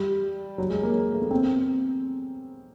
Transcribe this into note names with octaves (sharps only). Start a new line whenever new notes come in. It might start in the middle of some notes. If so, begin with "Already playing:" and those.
Already playing: G3
F#3
G#3
A#3
A3
B3
C4